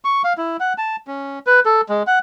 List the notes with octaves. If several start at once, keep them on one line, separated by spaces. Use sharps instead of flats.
C#6
F5
E4
F#5
A5
C#4
B4
A4
G#3
F#5